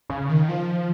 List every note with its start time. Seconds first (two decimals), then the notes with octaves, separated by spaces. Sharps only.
0.10 C#3
0.29 D#3
0.49 F3